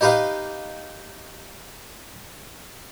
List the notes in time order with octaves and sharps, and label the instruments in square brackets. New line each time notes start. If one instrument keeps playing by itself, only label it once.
[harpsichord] D#4 G4 B4 D#5 F5